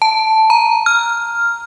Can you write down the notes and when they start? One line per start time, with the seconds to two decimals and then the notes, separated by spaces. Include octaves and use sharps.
0.02 A5
0.50 A#5
0.86 F6